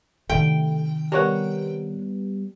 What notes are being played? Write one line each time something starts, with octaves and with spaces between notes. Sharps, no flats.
C3 D#3 A3 G5
G3 B3 A#4 C#5 F#5